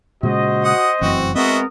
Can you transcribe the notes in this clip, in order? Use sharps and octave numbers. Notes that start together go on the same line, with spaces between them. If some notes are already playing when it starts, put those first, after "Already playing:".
A#2 C#3 G#3 F#4 C5 D#5
F#5 D#6
F1 F#2 E3 C4 F#4
G#3 B3 C4 F#4 A#4 D#5 E5 D#6